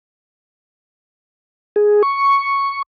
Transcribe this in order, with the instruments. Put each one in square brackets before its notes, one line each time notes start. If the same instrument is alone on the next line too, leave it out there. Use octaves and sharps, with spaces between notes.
[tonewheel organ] G#4
C#6